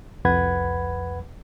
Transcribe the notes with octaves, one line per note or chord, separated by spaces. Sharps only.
C2 F2 B4 F#5 B5 G#6